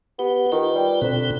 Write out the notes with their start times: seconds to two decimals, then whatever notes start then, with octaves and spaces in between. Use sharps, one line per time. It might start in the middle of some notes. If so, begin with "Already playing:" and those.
0.19 B3 G4
0.52 D#3 F4 B4 C5
0.75 G3
1.02 D2 B2 C4